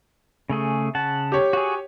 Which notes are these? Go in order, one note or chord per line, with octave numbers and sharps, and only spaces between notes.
C#3 A3 G#4
C#3 F#5 A5
G4 C#5
F#4 G#4